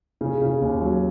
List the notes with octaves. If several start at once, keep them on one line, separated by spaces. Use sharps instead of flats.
C#3
C#3
D#2
F#3